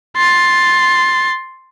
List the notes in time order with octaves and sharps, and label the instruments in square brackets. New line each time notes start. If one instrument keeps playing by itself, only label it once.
[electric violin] C6 A6